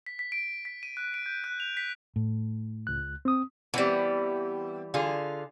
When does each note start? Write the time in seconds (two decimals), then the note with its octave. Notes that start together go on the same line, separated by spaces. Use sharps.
0.06 B6
0.19 B6
0.32 D7
0.65 B6
0.83 D#7
0.97 F#6
1.14 D7
1.26 G6
1.44 F#6
1.60 F7
1.77 B6
2.16 A2
2.87 C#2 F#6
3.25 C4 D#6
3.74 E3 G3 B3 C4
4.94 D3 F4 G#4